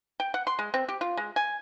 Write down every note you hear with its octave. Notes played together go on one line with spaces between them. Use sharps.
G5
F#5
C6
G#3
C4
G4
F4
G#3
G#5